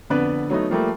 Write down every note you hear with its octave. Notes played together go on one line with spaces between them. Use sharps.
F2 D3 B3 B4 D5
F#3 A3 B3 D#4
F3 G3 A3 A#3